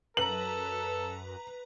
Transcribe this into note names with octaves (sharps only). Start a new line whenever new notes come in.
F#2 A4 B4 A#5 F#7